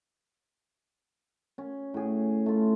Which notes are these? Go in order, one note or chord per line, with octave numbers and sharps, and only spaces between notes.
C#4
A2 G#4
A3 F4